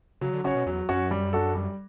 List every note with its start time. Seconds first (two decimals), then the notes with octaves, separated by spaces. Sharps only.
0.21 C#3 F#3
0.33 D3
0.44 C#3 C#4 F#4 C#5
0.55 B2
0.66 E2 F#3
0.89 F#2 C#4 F#4 C#5
1.11 G3
1.33 D4 F#4 A4
1.55 G3